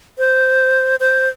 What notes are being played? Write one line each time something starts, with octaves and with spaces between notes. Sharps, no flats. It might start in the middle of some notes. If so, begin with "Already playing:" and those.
C5
C5